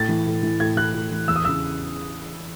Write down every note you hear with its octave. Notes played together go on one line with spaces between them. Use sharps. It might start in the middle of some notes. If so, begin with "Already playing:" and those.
Already playing: A2 A6
E3
A2
E3
A2 G#6
E3 F#6
A2
E3
E2 E6
D#6
C#3 E3 E6